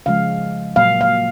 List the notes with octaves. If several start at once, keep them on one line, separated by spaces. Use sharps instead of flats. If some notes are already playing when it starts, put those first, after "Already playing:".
C#3 F3 G#3 F5
A#2 F#3 A#3 F5
F5